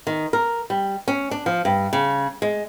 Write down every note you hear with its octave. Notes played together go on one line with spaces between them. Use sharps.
D#3
A#4
G3
C#4
D4
F3
G2
C#3
G#3